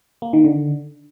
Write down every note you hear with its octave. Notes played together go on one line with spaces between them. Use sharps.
A#3
D#3
D3